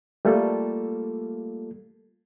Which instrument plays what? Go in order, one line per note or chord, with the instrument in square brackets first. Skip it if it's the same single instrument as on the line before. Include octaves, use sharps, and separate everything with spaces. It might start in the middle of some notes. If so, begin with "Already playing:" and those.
[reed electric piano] G3 A3 A#3 F4 A4